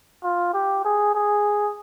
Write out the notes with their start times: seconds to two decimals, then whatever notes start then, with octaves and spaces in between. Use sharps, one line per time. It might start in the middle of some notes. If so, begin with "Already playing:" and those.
0.24 F4
0.54 G4
0.85 G#4
1.15 G#4